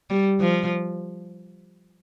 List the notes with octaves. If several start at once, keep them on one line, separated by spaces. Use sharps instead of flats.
G3
F3